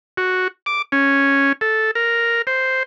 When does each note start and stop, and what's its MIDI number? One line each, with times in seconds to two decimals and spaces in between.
0.17 0.48 66
0.66 0.82 86
0.92 1.53 61
1.61 1.91 69
1.95 2.42 70
2.47 2.83 72